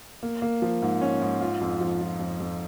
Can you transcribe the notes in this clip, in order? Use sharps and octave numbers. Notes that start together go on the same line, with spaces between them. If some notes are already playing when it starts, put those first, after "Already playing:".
A#3
A#3
F3
G#2
C#4
G#2
F4
F2
F3
F4
F2
F2